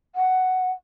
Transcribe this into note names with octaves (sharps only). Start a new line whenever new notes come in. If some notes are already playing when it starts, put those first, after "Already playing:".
F#5